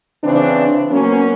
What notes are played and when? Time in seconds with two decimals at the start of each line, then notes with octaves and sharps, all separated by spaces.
0.24 C#3 E3 C4 D4
0.91 F#3 A#3 B3 C#4